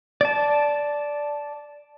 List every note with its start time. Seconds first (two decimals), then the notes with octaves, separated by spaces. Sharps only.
0.21 D5 A5